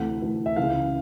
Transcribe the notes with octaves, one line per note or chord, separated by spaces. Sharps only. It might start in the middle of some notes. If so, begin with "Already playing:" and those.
Already playing: D2 C3 E3 A3 F#5
D2 C3 E3 A3
E5
C#2 C#3 E3 F5